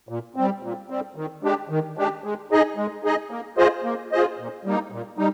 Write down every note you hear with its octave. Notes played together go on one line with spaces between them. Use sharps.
A#2
G3 C4
A#2
G3 C4
D#3
G#3 D4 G4
D#3
G#3 D4 G4
G#3
D#4 G#4 D#5
G#3
D#4 G#4 D#5
A#3
F4 G#4 C5 D#5
A#3
F4 G#4 C5 D#5
A#2
G3 A#3 D#4
A#2
G3 D#4